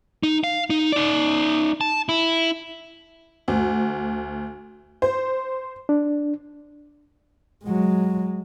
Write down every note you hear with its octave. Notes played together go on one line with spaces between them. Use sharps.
D#4
F5
D#4
D#4 D5
A5
E4
D2
C5
D4
F#3 G#3